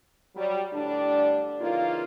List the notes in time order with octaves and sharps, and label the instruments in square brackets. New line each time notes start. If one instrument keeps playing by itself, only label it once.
[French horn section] F#3 G3
A2 D3 G3 D4
C#3 E3 A#3 D#4 F4